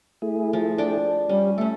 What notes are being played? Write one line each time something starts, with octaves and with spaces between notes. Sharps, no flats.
A3 E4 G#4
F3
D4 G5
G3 C#4 G4
A3 C#4 A4 E5